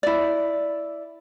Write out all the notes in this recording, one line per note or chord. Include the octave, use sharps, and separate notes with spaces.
E4 D5